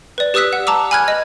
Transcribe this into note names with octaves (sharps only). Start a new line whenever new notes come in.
B4 D5
G4 B4 D#6 E6 F#6 B6
F#5
A5 A#5 D6 E6
G#5 B5 F6 F#6 G#6
D#5